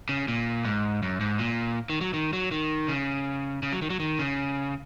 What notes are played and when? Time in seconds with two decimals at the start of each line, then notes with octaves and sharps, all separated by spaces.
0.09 C#3
0.28 A#2
0.65 G#2
1.03 F#2
1.21 G#2
1.39 A#2
1.90 D#3
2.01 F#3
2.14 D#3
2.33 F#3
2.51 D#3
2.88 C#3
3.63 C#3
3.73 F#3
3.82 D#3
3.90 F#3
4.00 D#3
4.19 C#3